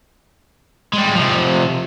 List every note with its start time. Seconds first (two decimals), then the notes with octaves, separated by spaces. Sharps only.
0.93 G3 G#3
1.16 C3 F3